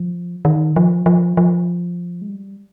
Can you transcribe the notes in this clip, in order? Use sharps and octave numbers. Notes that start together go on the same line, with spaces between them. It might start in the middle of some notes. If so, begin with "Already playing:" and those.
Already playing: F3
D#3
F3
F3
F3
G#3
G3